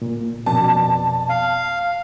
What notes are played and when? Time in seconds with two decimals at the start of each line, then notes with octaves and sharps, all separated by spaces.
0.02 A#2
0.46 F2 B2 D5 A5
1.29 F5